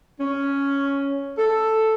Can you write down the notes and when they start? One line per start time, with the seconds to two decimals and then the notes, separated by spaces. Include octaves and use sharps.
0.20 C#4
1.37 A4